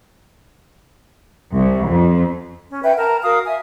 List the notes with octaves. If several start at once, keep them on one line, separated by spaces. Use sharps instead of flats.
C2
F2
C#4
B4 E5 F#5 G5
A#4 A5 A#5
F#4 A#4 F5 D#6
E5 G#5